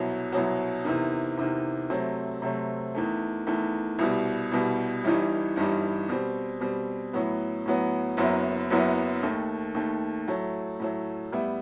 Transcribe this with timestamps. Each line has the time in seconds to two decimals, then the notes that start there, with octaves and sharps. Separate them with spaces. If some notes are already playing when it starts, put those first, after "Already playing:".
Already playing: C2 B2 F#3
0.32 C2 B2 F#3
0.84 E2 C3 D#3
1.37 E2 C3 D#3
1.90 C3 F#3 A3 C4
2.42 C3 F#3 A3 C4
2.95 E2 D#3 A3
3.47 E2 D#3 A3
3.99 C2 B2 G3
4.52 C2 B2 G3
5.04 G1 G2 E3 G3 D#4
5.56 G1 G2 E3 G3 D#4
6.09 B2 G3 C4
6.60 B2 G3 C4
7.13 A2 F#3 B3
7.65 A2 F#3 B3
8.17 F#1 F#2 F#3 B3 E4
8.70 F#1 F#2 F#3 B3 E4
9.23 D#2 D#3 A3
9.74 D#2 D#3 A3
10.28 A2 F#3 A3
10.80 A2 F#3 A3
11.32 A2 G3 B3 E4